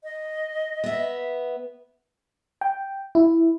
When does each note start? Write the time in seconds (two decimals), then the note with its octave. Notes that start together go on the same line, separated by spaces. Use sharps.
0.04 D#5
0.84 B3 E5
2.61 G5
3.15 E4